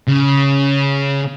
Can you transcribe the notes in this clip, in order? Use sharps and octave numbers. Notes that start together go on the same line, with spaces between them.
C#3